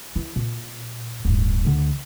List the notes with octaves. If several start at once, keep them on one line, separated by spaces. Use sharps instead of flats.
E3 E4
A#2
D1 G2
D2 D3